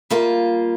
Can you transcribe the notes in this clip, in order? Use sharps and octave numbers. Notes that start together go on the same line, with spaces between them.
G3 A#3 F4